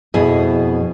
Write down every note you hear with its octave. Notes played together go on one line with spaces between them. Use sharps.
F2 B2 E4 G#4